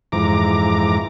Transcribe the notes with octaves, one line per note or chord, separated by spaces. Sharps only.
F2 G#2 E3 A#5 D6